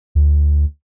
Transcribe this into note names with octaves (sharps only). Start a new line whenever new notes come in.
D2